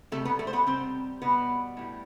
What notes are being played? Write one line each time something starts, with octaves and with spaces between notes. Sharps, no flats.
C3 G3 A3 A4
B3 B4
A3 A4
C5
B3 B4
C3 G3 C4 C5
B2 G3 B3 B4
A2 G3